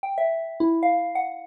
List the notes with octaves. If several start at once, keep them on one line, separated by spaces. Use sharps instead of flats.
G5
E5
E4
F5
F#5